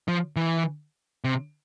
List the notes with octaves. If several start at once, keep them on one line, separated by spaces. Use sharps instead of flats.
F3
E3
C3